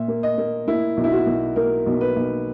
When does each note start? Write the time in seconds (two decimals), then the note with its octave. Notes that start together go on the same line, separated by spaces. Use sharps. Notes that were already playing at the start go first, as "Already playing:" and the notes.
Already playing: A#2 E5
0.08 A#3
0.23 D#5
0.38 A#3
0.67 A#3 E4
0.97 B1
1.04 E4
1.12 F#4
1.27 B1
1.56 A#3 A#4
1.86 B1
2.01 B4
2.16 B1